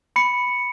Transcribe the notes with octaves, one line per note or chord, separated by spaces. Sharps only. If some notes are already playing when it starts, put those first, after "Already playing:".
B5 C#7